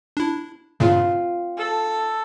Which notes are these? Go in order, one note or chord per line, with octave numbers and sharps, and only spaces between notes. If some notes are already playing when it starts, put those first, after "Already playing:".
D4 E4
G2 A#2 C#3 C4 F4
A4